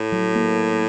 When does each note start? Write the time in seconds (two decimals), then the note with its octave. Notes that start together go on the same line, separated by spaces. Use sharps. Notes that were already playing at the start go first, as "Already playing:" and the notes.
Already playing: A2
0.12 F#3
0.35 A#3